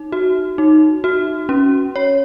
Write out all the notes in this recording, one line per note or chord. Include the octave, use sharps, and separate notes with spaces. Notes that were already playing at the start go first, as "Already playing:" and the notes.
Already playing: D#4
F#4
D#4
F#4
C#4
C#5